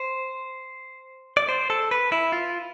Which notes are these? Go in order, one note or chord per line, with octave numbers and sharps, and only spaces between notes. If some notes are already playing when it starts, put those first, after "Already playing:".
Already playing: C5
D5
C5
A4
B4
E4
F4